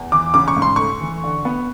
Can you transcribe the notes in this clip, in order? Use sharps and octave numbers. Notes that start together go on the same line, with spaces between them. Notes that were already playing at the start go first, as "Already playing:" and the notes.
Already playing: E2
E3 D6
C#3 D6
C#6
G#2
C6
A3 C#6
E3
D3
B3